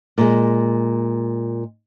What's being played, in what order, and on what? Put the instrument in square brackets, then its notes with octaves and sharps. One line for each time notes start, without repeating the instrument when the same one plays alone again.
[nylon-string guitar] A#2 G#3